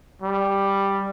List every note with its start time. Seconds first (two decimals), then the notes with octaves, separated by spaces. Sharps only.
0.22 G3